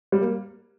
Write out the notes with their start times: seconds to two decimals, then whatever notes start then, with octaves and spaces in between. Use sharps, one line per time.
0.12 G3
0.22 A#3